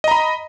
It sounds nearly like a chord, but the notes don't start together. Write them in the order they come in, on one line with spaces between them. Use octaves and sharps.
D#5 A#5 B5